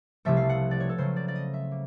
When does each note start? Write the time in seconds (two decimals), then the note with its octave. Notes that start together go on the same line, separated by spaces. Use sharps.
0.25 C2 C3 F3 A3 E5
0.37 F5
0.49 F#5
0.71 D5
0.80 C#5
0.89 A4
0.98 C#3 F#3 A3 C5
1.16 D5
1.28 D5
1.35 D#5
1.54 E5
1.71 A#3